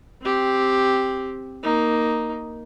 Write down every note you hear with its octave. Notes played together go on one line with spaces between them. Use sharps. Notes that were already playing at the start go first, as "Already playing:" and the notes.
C4 G4
A#3 D#4